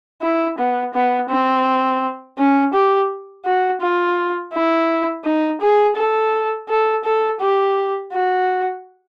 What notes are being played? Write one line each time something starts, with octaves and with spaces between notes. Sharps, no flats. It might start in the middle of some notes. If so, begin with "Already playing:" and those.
E4
B3
B3
C4
C#4
G4
F#4
F4
E4
D#4
G#4
A4
A4
A4
G4
F#4